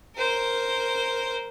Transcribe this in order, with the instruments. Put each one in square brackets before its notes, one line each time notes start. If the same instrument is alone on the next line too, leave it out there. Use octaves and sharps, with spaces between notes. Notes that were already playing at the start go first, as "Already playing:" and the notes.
[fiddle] A#4 C5